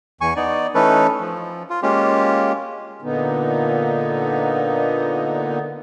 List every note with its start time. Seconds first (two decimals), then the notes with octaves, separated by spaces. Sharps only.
0.21 E2 G#5 C#6
0.36 B3 D#4 D5
0.75 E3 A3 C#4 D#4 A4 B4
1.20 F3
1.70 F4
1.83 G#3 A#3 C#4 F4 G4
3.02 A#2 D3 B3 D#4